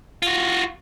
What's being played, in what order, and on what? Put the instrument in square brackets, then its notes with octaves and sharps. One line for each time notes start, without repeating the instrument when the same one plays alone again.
[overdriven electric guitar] F4 F#4